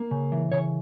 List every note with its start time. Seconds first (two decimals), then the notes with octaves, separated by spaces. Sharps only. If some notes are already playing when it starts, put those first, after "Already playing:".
Already playing: A#3
0.11 C#3
0.32 E3
0.52 C#3 C#5